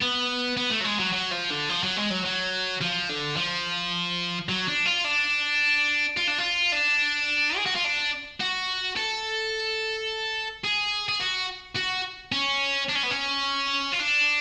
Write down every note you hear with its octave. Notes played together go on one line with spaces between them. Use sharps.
B3
B3
A3
F#3
G#3
F#3
F#3
F3
D3
F3
F#3
G#3
F#3
F#3
F3
D3
F3
F#3
D4
F4
D4
F4
D4
F4
D4
G#4
F#4
F4
D4
F#4
A4
G#4
G#4
F#4
F#4
C#4
D4
C#4
B3
C#4
F4
D4